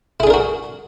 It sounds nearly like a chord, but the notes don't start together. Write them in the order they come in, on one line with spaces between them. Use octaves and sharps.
E4 G#4 D4 A#4 F#4